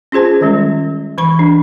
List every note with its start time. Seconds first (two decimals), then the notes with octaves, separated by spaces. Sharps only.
0.12 C#4 F4 G#4 C5 A5
0.41 D#3 G3 G#3 C#4
1.18 E3 B5 C#6
1.39 D4